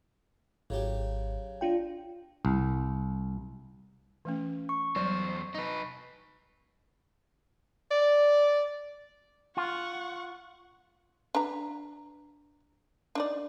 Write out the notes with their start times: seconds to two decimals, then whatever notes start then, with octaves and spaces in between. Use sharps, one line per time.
0.70 G#1 C#3 F#3 G4
1.61 D4 F4 G5
2.45 C2
4.25 E3 A3 C#4
4.69 C#6
4.96 E2 F#3 G3 C5 D5
5.55 D#4 B4
7.91 D5
9.57 F4 F#5 C#6
11.35 D4 B4 A#5
13.15 D4 D#4 D5